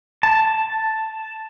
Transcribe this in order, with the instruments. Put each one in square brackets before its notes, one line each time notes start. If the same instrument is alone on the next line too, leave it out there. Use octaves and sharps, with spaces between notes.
[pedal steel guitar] A5